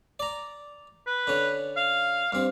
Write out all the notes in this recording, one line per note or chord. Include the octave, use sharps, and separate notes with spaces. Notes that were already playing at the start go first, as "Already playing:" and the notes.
D5 A#5
B4
D3 C#4
F5
G2 C4 F5